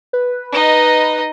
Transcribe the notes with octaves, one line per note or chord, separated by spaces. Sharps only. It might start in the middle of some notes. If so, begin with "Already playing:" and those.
B4
D#4 D#5